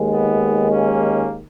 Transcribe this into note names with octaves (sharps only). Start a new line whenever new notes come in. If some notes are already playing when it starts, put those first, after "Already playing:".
Already playing: D#2 D#3 G#3
B3
A#3 C#4